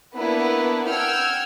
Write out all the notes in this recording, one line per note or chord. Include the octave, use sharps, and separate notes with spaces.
A#3 B3 D4 E4 B4
F#5 G5 E6 F6 G#6